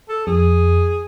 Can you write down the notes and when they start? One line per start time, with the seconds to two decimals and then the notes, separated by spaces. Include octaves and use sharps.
0.09 A4
0.27 F2 G#4